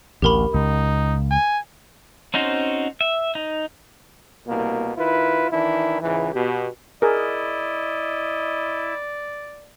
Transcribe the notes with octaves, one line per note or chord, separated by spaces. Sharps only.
A1 D2 G4 A#4 B5
C#2 D#4
G#5
C4 C#4 D#4 F#4 C5
E5
D#4
C2 B2 A#3
D#3 E4 F4 B4
D#3 E3 D4 E4
C#2 G#2 E3
B2 G4
E4 G#4 A#4 D5 D#5